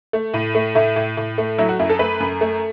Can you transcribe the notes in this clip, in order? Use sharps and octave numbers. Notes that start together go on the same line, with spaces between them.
A3
A2
A3
A2 E4
A2
A2
A3
F#3 E4
F#4
F#2 E4
A4
A3 B4
F#2
A3